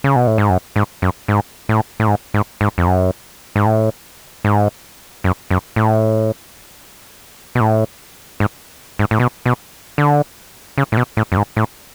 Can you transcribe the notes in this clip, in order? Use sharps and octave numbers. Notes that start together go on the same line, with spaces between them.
C#3
B2
A2
G#2
F#2
G#2
F#2
G#2
A2
A2
G#2
G#2
G#2
F2
F#2
G#2
A2
G#2
F#2
F#2
A2
B2
A2
G#2
G#2
A2
B2
B2
D3
C#3
A2
B2
A2
F#2
G#2
A2